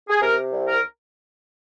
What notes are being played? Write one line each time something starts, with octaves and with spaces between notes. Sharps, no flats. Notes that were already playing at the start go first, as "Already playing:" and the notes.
G#4
C3 A#4
C2
A#4